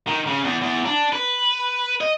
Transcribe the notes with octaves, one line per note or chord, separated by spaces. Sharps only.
D#3
C#3
E2
E2
D4
B4
D#5